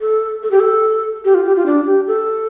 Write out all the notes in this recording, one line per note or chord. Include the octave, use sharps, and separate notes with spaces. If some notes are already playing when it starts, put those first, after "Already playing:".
A4
A4
G4
A4
G4
F4
G4
F4
D4
G4
A4